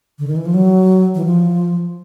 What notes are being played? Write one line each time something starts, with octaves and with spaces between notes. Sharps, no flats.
D3
D#3
E3
F3
F#3
E3
F3